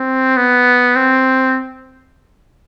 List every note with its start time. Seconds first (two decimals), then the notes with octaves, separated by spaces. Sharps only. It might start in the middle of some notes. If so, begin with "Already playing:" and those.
Already playing: C4
0.37 B3
0.96 C4